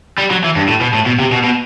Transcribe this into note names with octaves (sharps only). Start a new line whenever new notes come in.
G3
F#3
E3
G2
A2
B2
A2
B2
C3
B2
B2